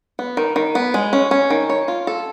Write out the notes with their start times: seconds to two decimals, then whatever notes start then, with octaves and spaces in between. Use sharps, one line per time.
0.19 B3
0.37 D#3
0.56 D#3
0.75 B3
0.94 G#3
1.13 C#4
1.31 C#4
1.50 D#3
1.70 C#5
1.88 F4
2.07 A4